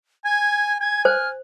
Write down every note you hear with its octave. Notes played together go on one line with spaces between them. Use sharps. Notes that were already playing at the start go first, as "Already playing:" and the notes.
G#5 G#6
G#5 G#6
C5 F6